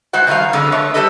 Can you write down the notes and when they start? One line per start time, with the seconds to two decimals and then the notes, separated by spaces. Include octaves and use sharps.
0.13 G#3 F#4 C5 F#5
0.27 C3 D#3 F3 G3 F5
0.53 F2 D3 G#3
0.72 A3 B3 C#5
0.94 G3 G#3 G4 A4 B4 D#5